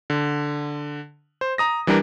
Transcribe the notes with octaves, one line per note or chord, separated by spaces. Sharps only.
D3
C5
A#5 D#6 A#6
E3 G3 D4 G4 A#4